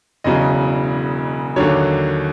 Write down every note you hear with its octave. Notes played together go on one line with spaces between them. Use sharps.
E1 E2 C#3 F#3 D#5
D#2 D3 F#3 C#5